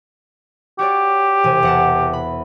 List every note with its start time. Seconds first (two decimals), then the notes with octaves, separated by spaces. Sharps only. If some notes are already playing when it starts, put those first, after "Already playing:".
0.79 F#4 G4 C#5 D5
1.44 E1 C3 G#5
1.63 E2 F#5 A5
2.13 B5